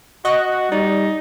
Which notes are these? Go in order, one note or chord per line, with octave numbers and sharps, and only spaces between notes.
F#4 D#5 C#6 F#6
G3 D#4 D5